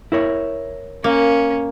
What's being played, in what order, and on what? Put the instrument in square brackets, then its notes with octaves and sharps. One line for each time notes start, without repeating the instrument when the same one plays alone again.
[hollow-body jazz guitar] E4 A#4 C#5
[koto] A#3 [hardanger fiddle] C#4